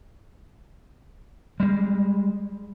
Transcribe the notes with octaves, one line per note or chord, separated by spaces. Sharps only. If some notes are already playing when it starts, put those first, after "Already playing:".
G3 G#3